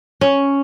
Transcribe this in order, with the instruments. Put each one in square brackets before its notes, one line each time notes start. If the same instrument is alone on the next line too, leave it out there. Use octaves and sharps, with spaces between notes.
[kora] C#4